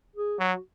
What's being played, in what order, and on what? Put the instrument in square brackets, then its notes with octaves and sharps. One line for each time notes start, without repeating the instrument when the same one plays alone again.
[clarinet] G#4
[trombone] F#3 [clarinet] F#4